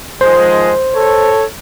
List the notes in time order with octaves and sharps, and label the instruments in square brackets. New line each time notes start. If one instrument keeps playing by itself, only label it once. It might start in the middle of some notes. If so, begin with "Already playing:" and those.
[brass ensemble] D#3 F3 G#3 [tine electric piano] C5
[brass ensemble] A4 C#5